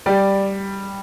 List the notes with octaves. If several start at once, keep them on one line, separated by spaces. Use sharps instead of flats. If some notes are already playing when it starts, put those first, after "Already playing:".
G3 D5